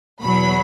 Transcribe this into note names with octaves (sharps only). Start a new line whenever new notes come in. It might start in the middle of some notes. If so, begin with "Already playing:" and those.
E2 B2 F#3 B5